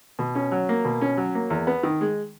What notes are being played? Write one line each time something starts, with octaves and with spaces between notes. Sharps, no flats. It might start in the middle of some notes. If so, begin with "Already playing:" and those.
B2
C#4
F#3
A#3
B2
C#4
F#3
A#3
E2
B3
D#3
G#3